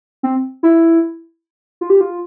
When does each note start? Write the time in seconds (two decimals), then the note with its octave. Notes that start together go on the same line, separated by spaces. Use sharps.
0.23 C4
0.63 E4
1.81 F4
1.90 G4
2.01 F4